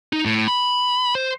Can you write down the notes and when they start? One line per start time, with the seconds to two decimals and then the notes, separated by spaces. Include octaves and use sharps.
0.13 D#4
0.26 A2
0.48 B5
1.15 C5